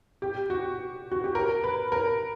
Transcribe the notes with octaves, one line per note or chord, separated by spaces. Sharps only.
G4
F#4
F#4
G4
A#4
B4
A#4